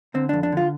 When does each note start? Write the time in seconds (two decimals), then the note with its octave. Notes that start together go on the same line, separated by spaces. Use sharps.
0.14 D3 C4
0.29 F2 D4
0.43 D4
0.52 D3 F4